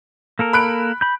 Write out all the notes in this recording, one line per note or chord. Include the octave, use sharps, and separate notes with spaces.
A#3 A4 A#4
B5 F#6 D7
B5 G6